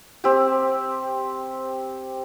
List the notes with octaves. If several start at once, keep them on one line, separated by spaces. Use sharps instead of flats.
C4 G4